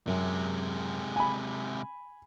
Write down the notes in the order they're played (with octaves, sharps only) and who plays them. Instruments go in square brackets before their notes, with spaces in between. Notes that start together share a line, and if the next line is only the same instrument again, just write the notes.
[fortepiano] F#2 [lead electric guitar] C3 G#3
[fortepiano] G#5 B5